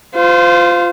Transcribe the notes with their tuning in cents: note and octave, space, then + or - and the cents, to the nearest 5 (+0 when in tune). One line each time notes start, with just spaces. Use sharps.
F4 +0 C5 -30